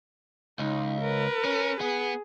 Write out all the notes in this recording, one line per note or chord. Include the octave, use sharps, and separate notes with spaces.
C#2 D#4
A#4 B4
C#4
B3 G#4